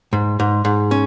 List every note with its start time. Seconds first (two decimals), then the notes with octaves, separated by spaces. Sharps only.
0.13 G#2
0.40 G#2
0.65 G#2
0.91 C#4